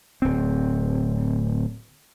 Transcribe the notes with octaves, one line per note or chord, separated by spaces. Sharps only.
D1 C4